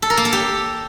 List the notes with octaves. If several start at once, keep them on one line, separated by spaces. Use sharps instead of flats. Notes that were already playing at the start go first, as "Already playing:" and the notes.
A4
A#4
A#3
A4
G4